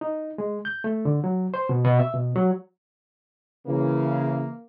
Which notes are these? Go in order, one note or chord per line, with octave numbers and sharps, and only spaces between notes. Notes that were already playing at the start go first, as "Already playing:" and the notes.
D#4
G#3
G6
A3
D3
F#3
C5
B2
B2
E5
B2
F#3
C#3 E3 A#3